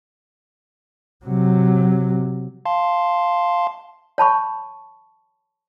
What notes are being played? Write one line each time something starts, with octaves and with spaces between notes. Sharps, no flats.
C3 F#3
F5 A5 C6
C#5 A5 B5 C#6